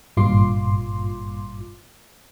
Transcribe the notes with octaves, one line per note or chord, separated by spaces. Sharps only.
G#1 G2 A#2 F4 C6 D6